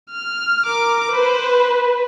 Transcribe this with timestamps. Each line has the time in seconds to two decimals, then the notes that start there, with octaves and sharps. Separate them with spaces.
0.10 F6
0.66 A#4 D6
1.12 B4 C5